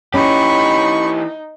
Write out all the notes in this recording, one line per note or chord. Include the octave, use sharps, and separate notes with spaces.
E3 C#4 D#4 G4 B5 C#6